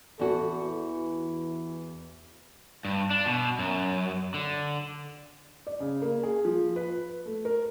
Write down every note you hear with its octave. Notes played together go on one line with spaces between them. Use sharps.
E2 F#4 A4
E3
G2
D4
B2
F#2
D3
D5
C#3
A#3
G#4
F3
B4
A3
A#4